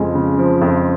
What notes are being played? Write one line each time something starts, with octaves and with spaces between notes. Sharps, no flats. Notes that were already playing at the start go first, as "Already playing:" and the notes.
Already playing: F2 C#3 F3 G#3
C#3
F3
F2